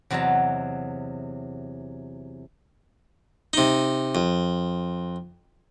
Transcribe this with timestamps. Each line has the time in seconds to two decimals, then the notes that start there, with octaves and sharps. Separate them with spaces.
0.10 E2 C3 F#3 D#5 A5 A#5
3.53 C3 D#4
4.15 F2